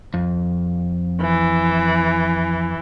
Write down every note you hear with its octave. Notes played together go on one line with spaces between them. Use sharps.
F2
E3